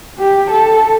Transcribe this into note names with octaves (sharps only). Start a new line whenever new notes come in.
G4
A4